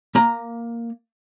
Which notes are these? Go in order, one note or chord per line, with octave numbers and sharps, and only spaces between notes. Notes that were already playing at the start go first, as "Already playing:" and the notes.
A#3 A#5